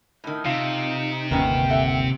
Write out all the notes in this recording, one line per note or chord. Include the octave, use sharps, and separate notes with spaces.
A2 D#3
C3 D#4 F4
G1 D#2 D#3 B3 C#4 G5
A4 E5 F#5